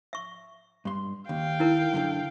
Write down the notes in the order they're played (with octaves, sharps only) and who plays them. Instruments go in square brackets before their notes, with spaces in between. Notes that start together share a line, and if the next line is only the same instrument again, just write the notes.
[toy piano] E5 C#6
[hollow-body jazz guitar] G2 C6
[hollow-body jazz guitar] D#2 [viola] F5 G5
[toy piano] D#4 E4 A#4
[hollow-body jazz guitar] F#2 D3 A4